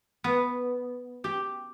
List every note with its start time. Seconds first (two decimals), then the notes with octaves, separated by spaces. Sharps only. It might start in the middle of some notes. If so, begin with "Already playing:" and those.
0.24 B3
1.24 G4